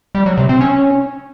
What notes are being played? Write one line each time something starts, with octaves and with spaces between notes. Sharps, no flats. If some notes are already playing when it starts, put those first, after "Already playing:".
G3
F#3
C3
C4
C#4